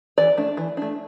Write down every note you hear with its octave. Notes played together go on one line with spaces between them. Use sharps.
E3 D5
A3 D4
E3
A3 D4